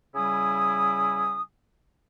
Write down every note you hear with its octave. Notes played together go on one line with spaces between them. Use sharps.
C#3 G3 E4 G#5 D#6